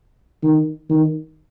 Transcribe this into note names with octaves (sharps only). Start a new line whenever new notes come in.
D#3
D#3